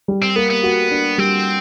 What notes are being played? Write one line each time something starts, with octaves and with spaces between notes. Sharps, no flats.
G3
C4
A#3 B3
B3
F#4
D4
G3 C4